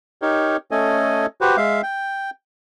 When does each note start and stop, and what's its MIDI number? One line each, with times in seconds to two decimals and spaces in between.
0.22 0.57 63
0.22 0.57 67
0.22 0.57 70
0.22 0.57 73
0.71 1.26 57
0.71 1.26 61
0.71 1.26 69
0.71 1.26 75
0.71 1.26 80
1.41 1.57 66
1.41 1.57 67
1.41 1.57 71
1.41 1.57 72
1.57 1.81 56
1.57 1.81 76
1.57 1.81 77
1.83 2.30 79